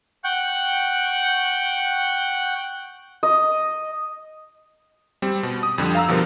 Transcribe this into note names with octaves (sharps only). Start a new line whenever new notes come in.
F#5 G5 C#6 F#6 G6
D#5
G3 C4
B2
D#6
F2 D3 G3
F5 A#5 E6
B2 D3 F3 G3 A#4